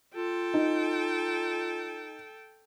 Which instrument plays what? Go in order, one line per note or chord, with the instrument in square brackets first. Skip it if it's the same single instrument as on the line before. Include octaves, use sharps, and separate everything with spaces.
[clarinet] F4 [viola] A4 G5
[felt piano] D#4